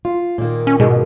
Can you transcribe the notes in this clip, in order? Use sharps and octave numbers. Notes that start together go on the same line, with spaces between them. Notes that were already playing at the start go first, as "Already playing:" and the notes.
F4
A#2 D#3 A#3
C#4
G#2 B2 G#3